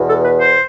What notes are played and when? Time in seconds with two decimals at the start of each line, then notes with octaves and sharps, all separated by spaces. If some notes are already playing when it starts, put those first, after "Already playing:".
Already playing: E2 B2
0.08 A4
0.25 B4
0.41 C5